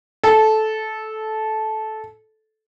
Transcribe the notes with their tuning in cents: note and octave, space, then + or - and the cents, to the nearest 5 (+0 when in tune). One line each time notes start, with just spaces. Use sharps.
A4 -15